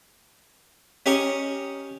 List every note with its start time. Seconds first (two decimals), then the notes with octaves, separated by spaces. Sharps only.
1.06 C#4 G4 A#4 D#5 C#6